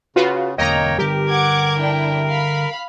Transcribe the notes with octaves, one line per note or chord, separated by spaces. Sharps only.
C#3 F4 F#4 B4
E1 E2 D3 A#3 C#5 D#5 G5 A#5
D3 G3 G4 A#4
F#5 D6 G#6
D4 E4 G5
F5 B5